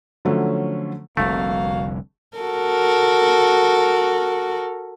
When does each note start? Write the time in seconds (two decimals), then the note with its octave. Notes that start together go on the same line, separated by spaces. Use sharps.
0.25 D3 F3 F#3 A3 C#4
1.17 F1 C2 D3 A3 A#3 F#4 F5
2.37 F#4 A4 A#4